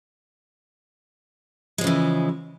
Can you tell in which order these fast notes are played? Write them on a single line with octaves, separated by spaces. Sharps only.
G#3 F3 C#3 E3